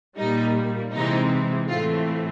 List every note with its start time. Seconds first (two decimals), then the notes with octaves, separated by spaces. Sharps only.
0.17 A#2 G3 A#3 D#4
0.93 C3 E3 G#3 C4 D#4
1.68 A2 E3 A3 C4 F4